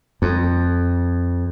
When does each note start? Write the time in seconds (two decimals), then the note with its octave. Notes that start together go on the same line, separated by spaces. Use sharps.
0.22 F2